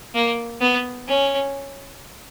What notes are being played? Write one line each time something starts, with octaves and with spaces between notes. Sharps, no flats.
A#3
B3
C#4